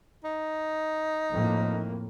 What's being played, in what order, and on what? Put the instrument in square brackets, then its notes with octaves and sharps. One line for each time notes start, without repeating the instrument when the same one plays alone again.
[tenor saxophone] D#4
[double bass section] F2 A2 A#3